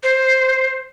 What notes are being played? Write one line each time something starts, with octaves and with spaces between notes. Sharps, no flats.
C5